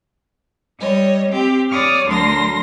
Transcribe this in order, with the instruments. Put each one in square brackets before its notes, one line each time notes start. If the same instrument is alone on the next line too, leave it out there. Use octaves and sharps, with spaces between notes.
[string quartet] G3 C#5 D#5
C4 G4
C#5 D5 D6 D#6 F6
D2 D3 F#3 A#4 C6 A#6